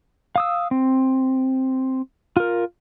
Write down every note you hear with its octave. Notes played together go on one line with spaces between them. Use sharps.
F5 D#6 E6
C4
F4 A#4